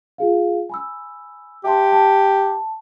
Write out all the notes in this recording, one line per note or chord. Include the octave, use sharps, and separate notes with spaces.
F4 G#4 F5
G#5 B5 E6
G4 E5 A5 C6
A5